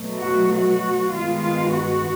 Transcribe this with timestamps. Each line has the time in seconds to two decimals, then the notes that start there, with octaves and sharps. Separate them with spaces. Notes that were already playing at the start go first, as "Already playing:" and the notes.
Already playing: B2 F#3 A3
0.17 F#4
0.49 F#4
1.09 G2 D#3 G#3 B3 F4
1.40 F4
1.72 F#4